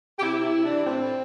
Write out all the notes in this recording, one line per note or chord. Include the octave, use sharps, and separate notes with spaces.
G4
C3 E4
C3
E4
C3
E3 D4
A2 C4
A2